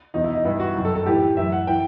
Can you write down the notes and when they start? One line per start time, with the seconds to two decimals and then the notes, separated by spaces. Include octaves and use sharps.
0.14 E2 B2 D#4
0.24 E4
0.35 D#4
0.44 G2 E3 E4
0.60 F#4
0.75 F#2 D#3
0.85 A4
0.95 A4
1.06 A2 E3 G4
1.36 F#2 E3 E5
1.52 F#5
1.67 E3 G5